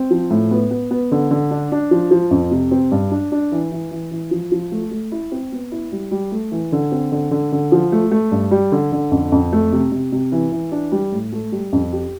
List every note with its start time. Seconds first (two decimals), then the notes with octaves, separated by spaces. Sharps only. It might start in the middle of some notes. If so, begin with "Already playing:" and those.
Already playing: C4
0.11 F3
0.31 A2
0.51 B3
0.71 B3
0.91 B3
1.11 D3
1.31 D3
1.51 D4
1.72 D4
1.91 F3
2.11 F3
2.31 F2
2.51 C3
2.71 C4
2.91 G2
3.11 D4
3.32 D4
3.52 E3
3.72 E3
3.91 E3
4.11 E3
4.31 F3
4.52 F3
4.72 A3
4.91 A3
5.12 E4
5.32 C4
5.52 B3
5.72 E4
5.92 G3
6.11 G3
6.32 A3
6.52 E3
6.72 D3
6.92 C4
7.12 D3
7.31 D3
7.52 D3
7.72 F3
7.92 A3
8.11 A3
8.31 G2
8.51 G3
8.72 D3
8.92 D3
9.12 F2
9.32 F2
9.52 A3
9.72 C3
9.92 C3
10.12 C3
10.32 E3
10.52 E3
10.72 D4
10.92 G3
11.12 A2
11.32 A3
11.52 G3
11.73 F2
11.92 G4